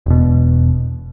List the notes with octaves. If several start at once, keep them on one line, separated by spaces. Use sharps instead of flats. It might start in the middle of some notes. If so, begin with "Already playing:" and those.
E1 B2